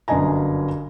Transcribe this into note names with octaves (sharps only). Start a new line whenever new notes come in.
G1 F#2 D4 D#5 G#5 A#5